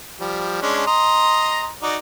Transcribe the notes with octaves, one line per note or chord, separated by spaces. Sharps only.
F3 G3
G#3 C#4 D4
D#5 A#5 C6
D#4 F#4 D5